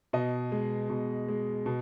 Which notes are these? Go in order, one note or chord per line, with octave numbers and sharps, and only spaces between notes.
B2 D#5
G#3
B2
G#3
B2